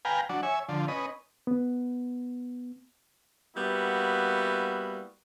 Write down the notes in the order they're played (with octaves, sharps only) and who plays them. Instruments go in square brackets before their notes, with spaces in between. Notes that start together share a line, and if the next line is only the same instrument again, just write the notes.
[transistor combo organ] B4 F5 G5 G#5 A#5
F#3 D4
C#5 E5 G#5
D3 F3
C#4 B4 D#5
[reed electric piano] B3
[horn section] G3 A#3 B3 E4 F#4